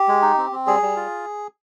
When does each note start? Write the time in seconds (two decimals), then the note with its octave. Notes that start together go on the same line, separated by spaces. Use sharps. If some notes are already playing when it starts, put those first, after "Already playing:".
Already playing: G4
0.08 G#3
0.22 D#4
0.38 C4
0.52 C4
0.67 G3 G#4
0.82 G3
0.96 F4